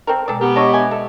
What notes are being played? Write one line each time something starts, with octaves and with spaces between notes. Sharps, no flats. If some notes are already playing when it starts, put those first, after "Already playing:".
C4 A4 A#4
B2 G#3 A4 D5
B3 G4 A#4
D4 C#5 D#5 E5 A#6
E5 G#5
A4